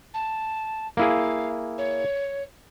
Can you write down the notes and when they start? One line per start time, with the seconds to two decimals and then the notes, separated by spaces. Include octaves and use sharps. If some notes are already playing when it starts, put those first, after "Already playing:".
0.14 A5
0.97 A#3 E4 G#4 F5
1.78 C#5